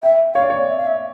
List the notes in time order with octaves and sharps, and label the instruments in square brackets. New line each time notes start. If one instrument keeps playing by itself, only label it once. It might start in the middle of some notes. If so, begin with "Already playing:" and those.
[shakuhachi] E5 [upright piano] G5
[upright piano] C#5 [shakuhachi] F5
[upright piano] D5
C#5
[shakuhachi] E5
F5
E5